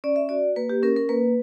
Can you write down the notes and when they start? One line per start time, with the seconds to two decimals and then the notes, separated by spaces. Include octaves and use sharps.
0.04 C#4 D5
0.16 E5
0.29 F#4 D5
0.56 A#3 B4
0.70 G4
0.83 C#4 A#4
0.96 A#4
1.09 A#3 B4